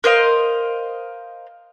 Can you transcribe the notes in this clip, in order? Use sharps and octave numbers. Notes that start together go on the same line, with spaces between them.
A#4 C5 D#5 F5